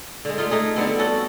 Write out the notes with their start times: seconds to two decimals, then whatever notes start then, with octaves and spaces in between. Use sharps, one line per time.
0.25 D3 G#3
0.38 A3 D#4 F4
0.51 A3 D#4 G#4
0.76 D3 G3 B3 C4
0.99 C#4 F#4 A4